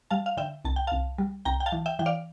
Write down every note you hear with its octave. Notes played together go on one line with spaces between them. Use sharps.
G3 F5 A5
F5
D3 E5 G5
C2 A5
G5
C2 F5 A5
G3
C2 G5 A#5
G5
F5 A5
E3
E5 G5
E3 G5
D5 F5